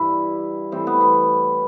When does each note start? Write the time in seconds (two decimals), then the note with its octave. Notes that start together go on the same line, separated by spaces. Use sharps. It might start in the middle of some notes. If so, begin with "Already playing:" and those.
Already playing: G2 E3 G3 E4
0.72 A2 E3 G3 C4
0.87 B3
1.01 B3